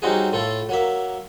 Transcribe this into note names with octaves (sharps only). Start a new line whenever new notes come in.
F#3 G3 C4 D#4 F#4 G#4
A2 A3 F4 A4
F#3 A#3 E5